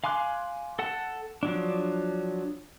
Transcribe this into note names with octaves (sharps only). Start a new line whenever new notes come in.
F5 G#5 C6 D6 F#6
A4 F#5 A5
F3 F#3 D4